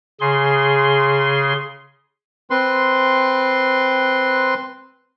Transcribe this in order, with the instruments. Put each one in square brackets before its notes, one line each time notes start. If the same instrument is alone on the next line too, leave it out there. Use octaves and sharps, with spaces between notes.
[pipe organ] C#3 G#4 C6
[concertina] C4 B4 C6